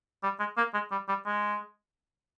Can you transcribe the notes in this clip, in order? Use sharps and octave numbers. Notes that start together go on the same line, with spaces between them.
G3
G#3
A#3
G#3
G3
G3
G#3